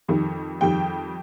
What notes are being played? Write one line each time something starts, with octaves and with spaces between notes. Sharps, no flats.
F2 D#3 G3
F2 D#3 G3 G5